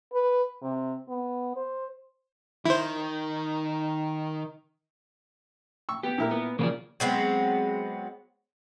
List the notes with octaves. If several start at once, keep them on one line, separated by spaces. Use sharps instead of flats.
B4
C3
B3
C5
D#3 E4 C5
C#6 E6
B3 G4
A#2 E4 A#4
B3
C#3 F3 A#3 B4 D5
F#3 G#3 B3 C4